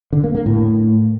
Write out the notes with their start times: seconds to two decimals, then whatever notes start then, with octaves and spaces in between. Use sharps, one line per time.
0.13 D3
0.24 A#3
0.35 A#3
0.46 A2